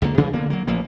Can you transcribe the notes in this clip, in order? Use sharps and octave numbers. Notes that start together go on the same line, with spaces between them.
C#2 D3 D#3 A#3
C3 E3 G3 A#3
D3 A#3 B3
F#3 A#3
A1 F3 A#3